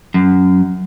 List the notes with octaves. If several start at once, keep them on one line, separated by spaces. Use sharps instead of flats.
F#2